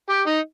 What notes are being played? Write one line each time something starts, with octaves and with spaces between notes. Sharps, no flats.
G4
D#4